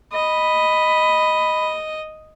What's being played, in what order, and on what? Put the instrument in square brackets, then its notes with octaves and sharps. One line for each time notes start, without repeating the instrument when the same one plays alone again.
[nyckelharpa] D#5 [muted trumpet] B5